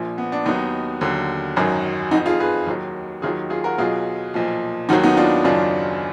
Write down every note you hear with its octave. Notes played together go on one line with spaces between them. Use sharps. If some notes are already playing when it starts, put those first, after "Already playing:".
Already playing: A#1 A#2 F3
B3
D4
D#2 D#3 F#3 B3 D#4
D#2 D3 F#3
G#1 F#2 D#3 F#3
F2 F3 D#4 F#4
F4 G#4
G#4 B4
D#2 D#3 F#3
D#2 D#3 F#3 F4 G#4
F4 G#4
F#4 A#4
B1 B2 F#3 F4 G#4
B1 A#2 F3
D#2 D#3 F#3 D#4 F#4
B3 D#4
D4 F4
F#1 F#2 D#3 F#3 D4 F4